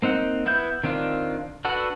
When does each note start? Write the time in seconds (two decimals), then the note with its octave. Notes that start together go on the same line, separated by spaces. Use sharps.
0.02 A#3 C4 D#4 F#5
0.46 B3 E4 E5 G6
0.84 D#3 C4 D4 F4
1.65 D4 F#4 A4 B4 F#5